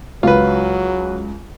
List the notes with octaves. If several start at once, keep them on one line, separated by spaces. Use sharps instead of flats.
C#2 F#3 F4 B4